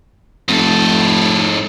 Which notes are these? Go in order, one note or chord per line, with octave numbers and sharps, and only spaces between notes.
F1 G#2 A4